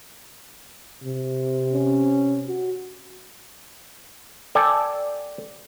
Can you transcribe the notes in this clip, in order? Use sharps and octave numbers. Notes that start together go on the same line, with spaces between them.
C3
C#4
F#4
A4 D5 G5 G#5